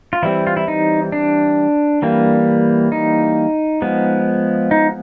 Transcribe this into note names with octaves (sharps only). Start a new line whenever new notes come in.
F4
E3 G3 C4 E4
F4
E4
D#4
D4
E3 G3 A#3
D#4
F3 G#3 B3
D#4